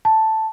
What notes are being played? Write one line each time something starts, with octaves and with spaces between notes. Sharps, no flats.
A5